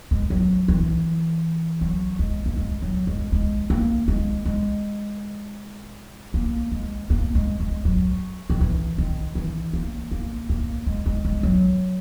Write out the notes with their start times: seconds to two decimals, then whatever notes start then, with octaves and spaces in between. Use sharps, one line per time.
0.11 G#3
0.30 F#3
0.68 E3
1.81 F#3
2.19 G#3
2.46 A#3
2.57 G#3
2.82 F#3
3.07 G#3
3.32 G#3
3.70 A#3
4.08 G#3
4.45 G#3
6.34 A#3
6.72 G#3
7.10 A#3
7.35 G#3
7.60 G#3
7.85 F#3
8.50 D#3
8.60 E3
8.98 D#3
9.35 E3
9.73 A#3
10.11 A#3
10.49 A#3
10.87 G#3
11.06 G#3
11.25 G#3
11.43 F#3